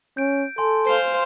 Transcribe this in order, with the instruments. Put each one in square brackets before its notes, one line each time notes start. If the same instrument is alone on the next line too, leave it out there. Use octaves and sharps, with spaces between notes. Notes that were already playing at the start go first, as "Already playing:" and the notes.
[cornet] C#4 [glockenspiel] G6 D7
[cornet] A4 [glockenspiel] G#5 C6
[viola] C5 F5 [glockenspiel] C7